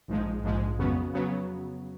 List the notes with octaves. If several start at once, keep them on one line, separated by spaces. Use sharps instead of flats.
A#1 G#2 F3 G#3
A#1 G#2 F3 G#3
F2 C#3 F#3 B3
C#3 F#3 B3